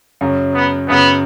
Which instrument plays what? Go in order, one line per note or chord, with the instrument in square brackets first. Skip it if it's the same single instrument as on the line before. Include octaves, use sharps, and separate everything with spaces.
[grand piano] F#2 C#3 F#3
[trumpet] B3
[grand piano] F#2 C#3 F#3 [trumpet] B3